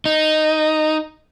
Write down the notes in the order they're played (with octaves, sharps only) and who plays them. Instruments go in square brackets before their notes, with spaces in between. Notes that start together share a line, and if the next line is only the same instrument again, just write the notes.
[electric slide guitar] D#4